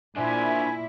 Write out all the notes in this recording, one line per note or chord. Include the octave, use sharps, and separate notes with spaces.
A#2 D4 E4 C5 G#5